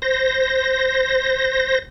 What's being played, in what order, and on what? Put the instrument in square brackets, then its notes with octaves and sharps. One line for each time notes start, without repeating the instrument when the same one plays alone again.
[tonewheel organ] C5 A#6